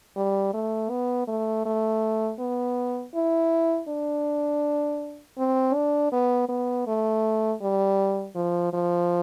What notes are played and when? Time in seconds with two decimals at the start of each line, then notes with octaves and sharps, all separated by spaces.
0.16 G3
0.54 A3
0.90 B3
1.28 A3
1.66 A3
2.39 B3
3.15 E4
3.88 D4
5.38 C4
5.75 D4
6.12 B3
6.49 B3
6.87 A3
7.62 G3
8.35 F3
8.73 F3